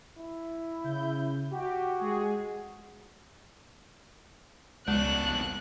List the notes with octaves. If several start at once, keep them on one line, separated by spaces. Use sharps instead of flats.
E4
C#3 G6
F#4 G4
G#3 G#4
C#2 B2 G#3 D4 F#6
C2